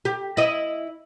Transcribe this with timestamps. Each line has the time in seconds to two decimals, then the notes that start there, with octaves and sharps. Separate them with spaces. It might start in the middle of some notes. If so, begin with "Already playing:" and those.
0.05 G4
0.37 E4 D#5